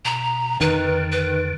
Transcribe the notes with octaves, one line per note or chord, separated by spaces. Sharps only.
B2 A#5
F2 D3 D#3 B4
B4